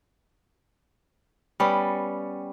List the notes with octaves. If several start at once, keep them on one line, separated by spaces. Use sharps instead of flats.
G3 B3 C#4